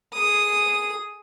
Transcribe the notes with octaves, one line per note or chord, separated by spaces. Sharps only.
G#4 D#6